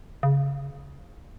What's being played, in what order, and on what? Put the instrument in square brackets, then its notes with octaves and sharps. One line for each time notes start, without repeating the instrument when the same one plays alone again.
[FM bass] C#3